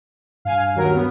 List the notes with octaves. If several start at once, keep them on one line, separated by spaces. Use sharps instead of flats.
G2 F5 G#5
D#2 F#3 A#4
B3